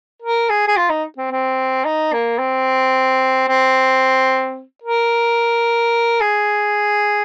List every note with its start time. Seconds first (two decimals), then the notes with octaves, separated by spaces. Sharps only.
0.22 A#4
0.49 G#4
0.68 G#4
0.77 F4
0.89 D#4
1.18 C4
1.31 C4
1.85 D#4
2.13 A#3
2.39 C4
3.48 C4
4.84 A#4
6.20 G#4